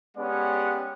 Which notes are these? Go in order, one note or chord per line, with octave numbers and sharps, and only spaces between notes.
G#3 B3 C#4 G4 D5 F#5